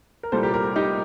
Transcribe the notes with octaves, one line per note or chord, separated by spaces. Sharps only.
A#4
C2 A#2 G3 A4 C5
G4 A#4
G4 A#4
D#4 G4